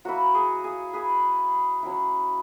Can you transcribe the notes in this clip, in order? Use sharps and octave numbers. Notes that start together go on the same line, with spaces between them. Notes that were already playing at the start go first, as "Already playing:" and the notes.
F#3 A#3 E4 F#4
G#4
G#4
G#4 B4
F#3 C#4 E4